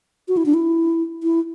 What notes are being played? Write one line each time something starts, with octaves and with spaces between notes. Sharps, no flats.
F#4
E4
D4
E4
E4